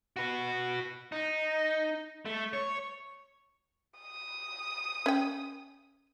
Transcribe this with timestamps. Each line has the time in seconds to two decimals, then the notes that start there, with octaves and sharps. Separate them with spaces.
0.16 F#4 B4
1.12 D#4
2.26 A3
2.53 C#5
3.99 D#6
5.06 C#4 G5